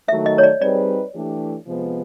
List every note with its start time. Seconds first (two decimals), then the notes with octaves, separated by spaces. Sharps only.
0.08 D#3 F#3 A3 E5
0.26 D#5
0.38 C#5
0.43 D5
0.61 G3 C4 D#4 G#4 B4 D5
1.14 E3 A3 D4 G4
1.67 C3 F3 G#3 B3